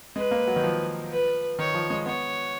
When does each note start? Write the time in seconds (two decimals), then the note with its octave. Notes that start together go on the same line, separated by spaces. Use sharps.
0.16 G#3 B4
0.31 A#3
0.48 F#3
0.56 D#3
0.64 F3
1.11 B4
1.59 D#3 C#5
1.74 F3
1.90 G#3
2.06 B3 C#5